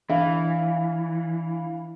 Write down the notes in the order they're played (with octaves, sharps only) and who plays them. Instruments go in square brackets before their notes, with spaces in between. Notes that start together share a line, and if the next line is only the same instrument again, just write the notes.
[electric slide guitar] E3 [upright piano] D4 E5 F5